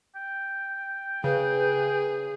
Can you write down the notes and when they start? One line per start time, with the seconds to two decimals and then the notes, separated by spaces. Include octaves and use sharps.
0.15 G5
1.24 C#3 G#4 B4